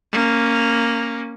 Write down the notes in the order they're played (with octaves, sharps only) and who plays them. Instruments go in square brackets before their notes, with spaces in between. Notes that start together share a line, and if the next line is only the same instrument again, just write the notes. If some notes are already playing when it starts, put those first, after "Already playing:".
[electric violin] A#3 C#4